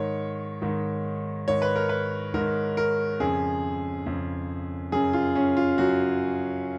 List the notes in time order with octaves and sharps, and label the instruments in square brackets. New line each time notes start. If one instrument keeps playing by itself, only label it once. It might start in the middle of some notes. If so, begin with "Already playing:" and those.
Already playing: [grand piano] G#2 D#3 C#5
G#2 D#3
G#2 D#3 C#5
B4
A#4
B4
G#2 D#3 A#4
A#4
F2 C#3 G#4
F2 C#3
F#2 C#3 G#4
F4
C#4
F4
F#2 C#3 F#4